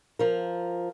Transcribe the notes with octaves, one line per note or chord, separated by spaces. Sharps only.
F3 A#4